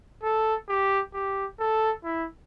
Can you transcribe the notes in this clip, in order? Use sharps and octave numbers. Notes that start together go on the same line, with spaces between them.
A4
G4
G4
A4
E4